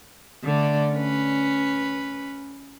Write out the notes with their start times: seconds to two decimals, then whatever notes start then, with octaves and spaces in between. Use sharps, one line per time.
0.44 D3 A3 D5
0.93 C#4 B4